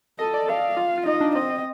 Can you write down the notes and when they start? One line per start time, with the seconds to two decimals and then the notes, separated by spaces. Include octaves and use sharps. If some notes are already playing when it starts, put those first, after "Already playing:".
0.19 A4 D#5
0.34 D5
0.48 A4 F5
0.77 F4
0.98 F4
1.06 D#4 D#5
1.21 D4
1.35 C4 D#5